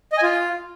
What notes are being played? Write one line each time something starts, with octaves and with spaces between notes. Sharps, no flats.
D#5
G#5
F4